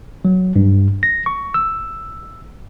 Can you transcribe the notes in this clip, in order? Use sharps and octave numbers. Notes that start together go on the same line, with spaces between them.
F#3
G2
A#6
C#6
E6